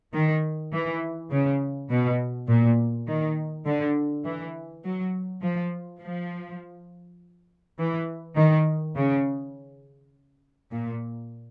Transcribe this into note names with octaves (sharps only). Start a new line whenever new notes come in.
D#3
E3
C#3
B2
A#2
D#3
D3
E3
F#3
F3
F3
E3
D#3
C#3
A#2